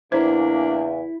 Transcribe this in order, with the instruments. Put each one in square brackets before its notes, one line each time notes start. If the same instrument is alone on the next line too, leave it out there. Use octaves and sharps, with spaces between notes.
[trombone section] E2 C#3 [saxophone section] A#3 D4 [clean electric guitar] E4 [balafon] C5